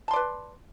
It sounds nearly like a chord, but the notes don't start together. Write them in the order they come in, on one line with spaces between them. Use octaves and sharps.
A5 C6 D5 B4